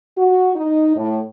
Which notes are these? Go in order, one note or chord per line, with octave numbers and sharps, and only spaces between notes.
F#4
D#4
A2